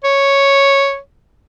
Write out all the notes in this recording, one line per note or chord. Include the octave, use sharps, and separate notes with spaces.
C#5